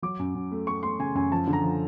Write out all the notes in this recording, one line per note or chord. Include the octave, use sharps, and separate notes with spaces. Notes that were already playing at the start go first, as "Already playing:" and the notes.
F#3 D6
F#2
F#2
A3
A3 C#6
A3 C6
C#3 G#5
F#2 G#5
F3 A5
D3
A#5
F3